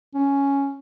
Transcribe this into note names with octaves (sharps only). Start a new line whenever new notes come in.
C#4